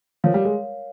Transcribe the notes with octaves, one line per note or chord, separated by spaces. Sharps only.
F3 A#4 C#5 F5
G3
G#3